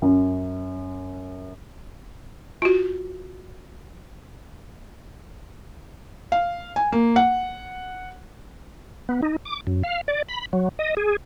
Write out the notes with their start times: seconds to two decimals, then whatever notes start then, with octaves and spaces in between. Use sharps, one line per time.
0.02 F#2
2.62 F4 F#4
6.32 F5
6.76 G#5
6.92 A#3
7.16 F#5
9.09 B3
9.22 D#4
9.45 D6
9.67 F#2
9.83 F5
10.08 D5
10.29 B5
10.53 F#3
10.79 D#5
10.97 G#4